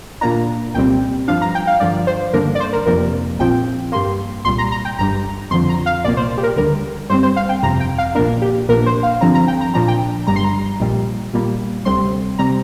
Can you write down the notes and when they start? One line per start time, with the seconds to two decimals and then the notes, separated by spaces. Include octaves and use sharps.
0.21 A#2 A#3 D4 A#5
0.74 C2 A#2 G3 C4 G5
1.28 G2 F3 D4 F5
1.42 A#5
1.55 G5
1.67 F5
1.80 G2 D3 F3 D5
2.07 C5
2.33 G2 D3 A#3 D4 A#4
2.55 D5
2.60 C5
2.73 A#4
2.86 F2 C3 A#3 D4 A#4
3.39 A#1 A#2 F3 C4 G5
3.92 G2 G3 A#3 C6
4.45 C2 A#2 G3 C6
4.58 A#5
4.72 A#5
4.85 G5
4.98 G1 G2 G3 A#5
5.51 F2 D3 F3 C6
5.69 A#5
5.86 F5
6.04 C2 A#2 A#3 D5
6.17 C5
6.38 G4
6.43 A#4
6.56 D2 D3 G3 A#4
7.10 G2 G3 C4 C5
7.23 C5
7.36 F5
7.49 G5
7.63 G1 F2 C3 A#5
7.80 G5
7.98 F5
8.15 A#1 A#2 A#3 D4 A#4
8.42 G4
8.69 A#1 A#2 A#3 D4 A#4
8.86 C5
9.03 F5
9.21 G2 D3 F3 C4 A#5
9.35 A#5
9.48 G5
9.61 A#5
9.74 A#2 F3 D4 A#5
9.88 G5
10.27 G1 G2 G3 A#5
10.36 C6
10.44 A#5
10.80 A#1 A#2 G3
11.33 A#2 G3 A#3
11.85 D2 C3 G3 C4 C6
12.39 C3 G3 C4 A#5